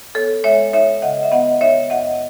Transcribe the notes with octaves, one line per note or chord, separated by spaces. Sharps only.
B3 A4 C#5
G#3 C#5 E5
D#4 C#5 E5
C#3 D#5 F#5
E5
B3 D#5 F#5
D#4 C#5 E5
F#2 D#5 F#5